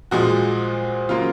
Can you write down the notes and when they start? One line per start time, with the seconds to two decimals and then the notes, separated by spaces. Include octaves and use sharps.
0.11 A#2 F3 G#3 F#4
1.09 C#3 F#3 A#3 F4